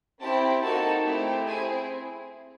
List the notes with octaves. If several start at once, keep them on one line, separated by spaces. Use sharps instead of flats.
C4 E4 G4 A5
A#3 D#4 F#4 A4 A5
A3 C4 E4 G4
C4 E4 G#4 G#5